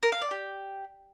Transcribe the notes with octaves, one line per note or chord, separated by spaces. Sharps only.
A#4
F5
D5
G4